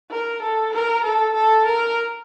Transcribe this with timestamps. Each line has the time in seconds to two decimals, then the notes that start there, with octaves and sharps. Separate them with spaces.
0.11 A#4
0.42 A4
0.73 A#4
1.04 A4
1.34 A4
1.66 A#4